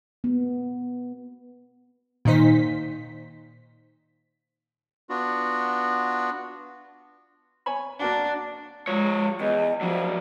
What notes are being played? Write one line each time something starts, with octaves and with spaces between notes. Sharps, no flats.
B3
A#2 D#3 D#4 C5 B6
B3 D4 F4 F#4
C#5 G#5 B5
A#3 D4 F#4 F#5
F3 G#3 C#5
E2 D#5
F3 F#3 D4